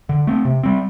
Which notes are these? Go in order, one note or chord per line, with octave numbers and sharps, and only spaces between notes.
D3
A3 C4
C3
G3 C4